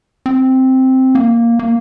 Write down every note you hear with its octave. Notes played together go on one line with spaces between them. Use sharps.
C4
A#3
A#3